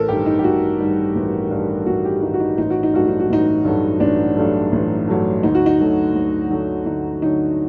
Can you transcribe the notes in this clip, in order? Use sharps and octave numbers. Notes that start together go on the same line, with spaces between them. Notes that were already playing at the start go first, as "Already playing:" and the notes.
Already playing: A1 A4 A#4
G2 D#3 G3 G4
D#4
G4
A1 F#4
G2 D#3 G3
A1
G2 D#3 G3
A1 F#4
G4
G2 D#3 G3 D#4
F#4
D#4
A1 D#4
F#4
D#4
G2 F#3 A3 F#4
D#4
F#4
A1 D#4
G2 F#3 A3
A1 D4
G2 F#3 A3
A1
G2 F#3 A3
D2 D#4
F#4
D#4
D3 F#3 A3
D2
D3 F#3 A3
D2 D#4
D3 F#3 A3 D#4